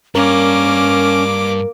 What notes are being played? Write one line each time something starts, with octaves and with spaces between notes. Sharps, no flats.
G2 A#3 C#4 A#4 D6